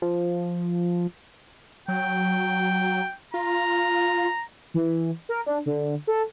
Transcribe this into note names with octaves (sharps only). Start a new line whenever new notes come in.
F3
F#3 G5
F4 A#5
E3
A#4
D4
D3
A4